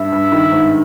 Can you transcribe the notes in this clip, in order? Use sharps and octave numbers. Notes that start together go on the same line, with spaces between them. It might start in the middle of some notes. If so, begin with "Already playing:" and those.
Already playing: G2 E5
G2
D#3
G#2